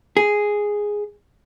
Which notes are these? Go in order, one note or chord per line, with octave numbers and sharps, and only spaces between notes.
G#4